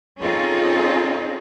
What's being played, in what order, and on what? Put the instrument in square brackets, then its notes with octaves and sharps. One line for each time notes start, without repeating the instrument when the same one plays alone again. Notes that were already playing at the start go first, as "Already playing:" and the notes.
[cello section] C4 C#4 D#4 F4 G#4 A4